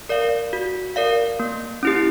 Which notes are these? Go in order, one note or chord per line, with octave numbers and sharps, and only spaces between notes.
A#4 D5 F5
F#4
A#4 D5 F5
A#3
C#4 E4 G4